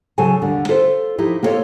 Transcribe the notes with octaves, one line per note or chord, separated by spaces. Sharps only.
C#3 F#3 A4 G#5 A5
D#2 D3 G3
F4 A4 C5 E5
F3 D#4 E4 G4
A#3 B3 F4 A4 C#5 D#5